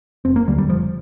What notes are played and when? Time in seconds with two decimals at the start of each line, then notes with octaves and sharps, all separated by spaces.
0.25 F1 C4
0.36 A#3
0.47 D#2 D3 G3
0.58 G3
0.68 F1 F3